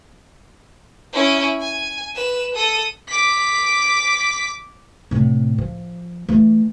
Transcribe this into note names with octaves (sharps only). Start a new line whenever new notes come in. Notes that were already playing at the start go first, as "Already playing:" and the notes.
C#4 E4
G#5
B4 E7
A4 D#6
D6 B6
A2 C3
F3
E3 A3